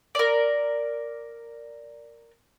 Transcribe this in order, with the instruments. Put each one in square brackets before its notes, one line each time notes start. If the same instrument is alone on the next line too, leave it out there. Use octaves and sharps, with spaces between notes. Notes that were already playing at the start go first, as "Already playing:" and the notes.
[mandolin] A#4 D5